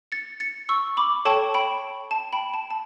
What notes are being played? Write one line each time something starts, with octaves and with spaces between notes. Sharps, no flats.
A6 C#7
A6 C#7
C#6 E6
B5 D6
A4 C#5 G5 A5 C#6
G5 B5
A5
G5 B5
A5
A5